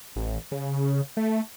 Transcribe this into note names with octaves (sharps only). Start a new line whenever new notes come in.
A1
C#3
A3